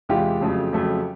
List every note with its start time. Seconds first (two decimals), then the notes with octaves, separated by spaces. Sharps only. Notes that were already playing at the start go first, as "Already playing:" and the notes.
0.09 E2 C3 E3 G#3 F4 G4
0.41 F2 C#3 F#3 A3
0.73 F2 C#3 F#3 A3